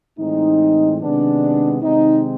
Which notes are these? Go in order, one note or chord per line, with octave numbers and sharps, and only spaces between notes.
A2 E3 G#3 C4 D#4
C3 D#3 G#3 B3 D4
C3 D#3 G#3 C4 D#4